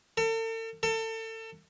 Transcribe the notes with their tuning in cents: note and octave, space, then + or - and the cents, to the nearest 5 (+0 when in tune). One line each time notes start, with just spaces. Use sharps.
A4 +40
A4 +30